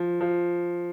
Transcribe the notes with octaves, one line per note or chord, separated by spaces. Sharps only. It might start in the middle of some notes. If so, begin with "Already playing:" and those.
Already playing: F3
F3